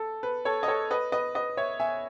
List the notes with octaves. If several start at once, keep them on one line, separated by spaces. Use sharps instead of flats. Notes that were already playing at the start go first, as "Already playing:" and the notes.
Already playing: A4
B4
A4 C#5
D#5
A4 C#5
B4 D#5
B4 D#5
B4 D#5
C#5 E5
E5 G#5